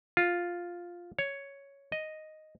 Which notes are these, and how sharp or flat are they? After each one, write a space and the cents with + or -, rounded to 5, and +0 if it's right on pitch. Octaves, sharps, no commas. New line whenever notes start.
F4 +5
C#5 +5
D#5 +0